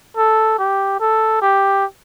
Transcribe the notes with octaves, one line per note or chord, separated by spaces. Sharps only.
A4
G4
A4
G4